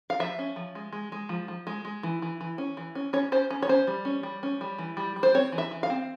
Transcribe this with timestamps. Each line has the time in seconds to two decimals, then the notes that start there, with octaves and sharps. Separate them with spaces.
0.10 F5
0.20 F3 E5
0.39 C#4
0.56 F3
0.75 G#3
0.93 G#3
1.12 G#3
1.29 F3
1.48 F3
1.67 G#3
1.85 G#3
2.03 E3
2.22 E3
2.41 E3
2.58 C#4
2.77 E3
2.95 C#4
3.13 C#4 C#5
3.32 C#4 C5
3.50 C#4
3.62 C#5
3.69 C#4 C5
3.87 G3
4.05 C#4
4.23 G3
4.43 C#4
4.61 G3
4.78 E3
4.97 G3
5.16 G3
5.23 C5
5.34 C4 C#5
5.52 E3
5.58 E5
5.71 E3
5.83 F5
5.90 C4